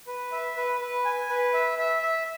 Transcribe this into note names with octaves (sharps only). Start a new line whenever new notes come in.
B4
E5
B4
B4
G#5
B4
E5
E5
E5